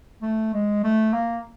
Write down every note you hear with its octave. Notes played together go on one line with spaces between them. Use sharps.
A3
G#3
A3
A#3